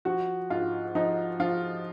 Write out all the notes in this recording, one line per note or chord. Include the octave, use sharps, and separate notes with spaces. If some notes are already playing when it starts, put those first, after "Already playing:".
F3 F#4
G#2 F4
F3 D#4
F3 F4